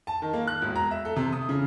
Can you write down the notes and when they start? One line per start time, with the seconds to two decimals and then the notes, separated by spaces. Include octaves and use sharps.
0.07 A5
0.22 D#3
0.33 A#3
0.48 F#6
0.62 E1
0.76 A#5
0.91 E5
1.05 A4
1.16 C3
1.32 D#6
1.49 C#3